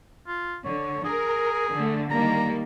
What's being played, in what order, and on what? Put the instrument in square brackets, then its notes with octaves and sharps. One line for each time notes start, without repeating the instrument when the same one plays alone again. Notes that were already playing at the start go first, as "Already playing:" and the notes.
[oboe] F4
[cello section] D3 [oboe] C#5
[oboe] G#4 [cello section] A#4
[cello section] D3 A3
[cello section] D#3 G3 A#3 [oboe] A#5